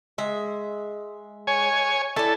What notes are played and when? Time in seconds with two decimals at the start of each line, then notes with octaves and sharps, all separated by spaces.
0.18 G#3 E5
1.47 C#5 G#5
2.16 E4 A4 D5